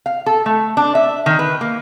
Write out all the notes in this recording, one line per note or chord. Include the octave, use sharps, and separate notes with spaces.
F5
A4
A3
D4
E5
D#3
B4
A#3